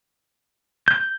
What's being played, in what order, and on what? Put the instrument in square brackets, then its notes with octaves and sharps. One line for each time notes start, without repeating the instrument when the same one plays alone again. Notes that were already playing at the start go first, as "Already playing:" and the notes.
[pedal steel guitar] G6